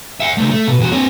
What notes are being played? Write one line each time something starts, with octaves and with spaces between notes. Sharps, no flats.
E5 F#5
C#3 A3
A3
B2
E2 F#4
C4 C#5